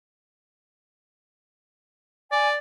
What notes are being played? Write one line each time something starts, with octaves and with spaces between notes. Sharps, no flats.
D5 G#5